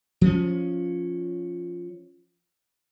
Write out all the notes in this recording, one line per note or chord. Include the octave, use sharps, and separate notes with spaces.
F3 C#4